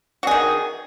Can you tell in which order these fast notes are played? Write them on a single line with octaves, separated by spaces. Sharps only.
F#4 G#4 D#3